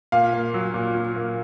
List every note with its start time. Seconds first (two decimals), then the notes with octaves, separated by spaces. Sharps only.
0.12 A#2 F5
0.34 A#3
0.54 F#3
0.74 A#2
0.95 A#2
1.16 A#3